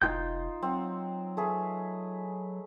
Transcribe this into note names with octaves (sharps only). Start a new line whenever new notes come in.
F1 D#4 F4 C5 G5 D#6 G6
F#3 C4 F#5
A3 G#4 B4